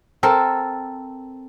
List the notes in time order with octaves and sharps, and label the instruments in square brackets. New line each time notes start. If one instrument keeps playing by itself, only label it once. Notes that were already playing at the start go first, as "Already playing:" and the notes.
[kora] C4 A4 A#4